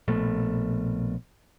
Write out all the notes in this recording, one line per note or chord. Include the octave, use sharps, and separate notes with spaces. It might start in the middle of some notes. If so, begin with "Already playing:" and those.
A#1 B2 A3